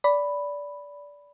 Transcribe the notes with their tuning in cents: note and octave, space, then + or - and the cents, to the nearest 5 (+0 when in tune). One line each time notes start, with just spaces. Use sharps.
D5 -20 B5 +0